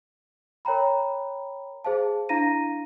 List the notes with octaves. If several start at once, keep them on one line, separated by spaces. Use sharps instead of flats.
A#4 C#5 G5 A#5 B5
G#4 C5 F5 A5
D4 E4 F5 A#5 A#6 D#7